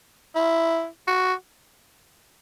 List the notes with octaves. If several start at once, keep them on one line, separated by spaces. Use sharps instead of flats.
E4
F#4